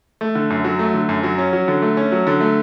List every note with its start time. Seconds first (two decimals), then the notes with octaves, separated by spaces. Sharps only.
0.21 A3
0.35 D3
0.50 F#2
0.64 F#3
0.79 A3
0.94 D3
1.09 F#2
1.23 F#3
1.38 C#4
1.53 F#3
1.68 D3
1.82 A3
1.97 C#4
2.12 F#3
2.27 D3
2.40 A3